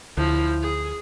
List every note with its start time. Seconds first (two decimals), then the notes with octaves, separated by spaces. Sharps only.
0.17 D2 F3 E4
0.62 G#4